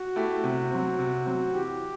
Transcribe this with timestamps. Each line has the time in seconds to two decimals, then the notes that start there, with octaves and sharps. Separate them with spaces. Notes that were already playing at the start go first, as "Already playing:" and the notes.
Already playing: F#4
0.16 A3 E4 G4
0.44 C3
0.71 F#3 C4
0.99 C3
1.26 F#3 C4
1.53 E3 G4